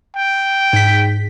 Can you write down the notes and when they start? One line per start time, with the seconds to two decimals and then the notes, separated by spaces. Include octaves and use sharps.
0.17 G5
0.73 G#2 B6